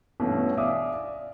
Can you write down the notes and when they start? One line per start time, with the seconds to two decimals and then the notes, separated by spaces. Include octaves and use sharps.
0.20 G2 B2 E3 A3 C#4
0.57 D5 E5 F5 G#5 D6 D#6
0.94 D5